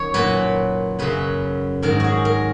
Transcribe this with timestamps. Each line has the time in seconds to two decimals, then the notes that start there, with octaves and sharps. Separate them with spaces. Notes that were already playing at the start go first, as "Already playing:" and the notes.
Already playing: F#2 D#3 C#5
0.14 A#2 F#3 B4
0.99 F#2 C#3 F#3 B4
1.83 G#2 D#3 F#3 A#4
2.00 F#4 G#4
2.25 A#4